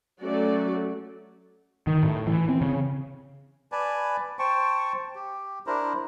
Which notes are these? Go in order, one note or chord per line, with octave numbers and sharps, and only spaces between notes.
F#3 A3 C#4 F#4 D5
D#3
A2
E3
C4
C#3
B4 D5 G#5 A5
C5 G5 A5 C#6
G4
D4 E4 A#4 C5